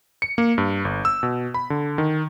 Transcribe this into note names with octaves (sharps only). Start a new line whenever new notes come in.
C#7
A#3
G2
G1
E6
B2
B5
D3
D#3